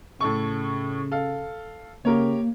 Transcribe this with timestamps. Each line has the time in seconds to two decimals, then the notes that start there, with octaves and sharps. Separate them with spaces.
0.21 A2 C#3 A4 C#6
1.11 A4 F5
2.05 C#3 A#3 G4 A#4 C#5